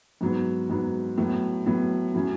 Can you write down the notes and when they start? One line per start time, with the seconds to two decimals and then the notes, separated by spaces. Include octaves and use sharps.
0.21 G#2 F#3 B3
0.69 G#2 F#3 B3
1.17 A2 F#3 B3
1.66 A2 F#3 B3
2.14 A2 F#3 C#4